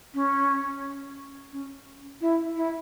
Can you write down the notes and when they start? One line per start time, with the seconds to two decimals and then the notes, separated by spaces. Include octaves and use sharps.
0.14 C#4
1.52 C#4
2.21 E4
2.56 E4